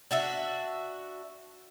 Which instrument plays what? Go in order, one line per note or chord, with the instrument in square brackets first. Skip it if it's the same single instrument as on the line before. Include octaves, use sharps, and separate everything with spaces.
[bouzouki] D4 F#4 E5